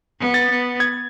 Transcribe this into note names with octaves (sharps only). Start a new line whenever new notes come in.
B3
A6
B3
G#6